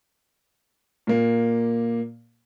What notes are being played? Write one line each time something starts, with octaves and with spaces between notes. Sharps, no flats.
A#2 A#3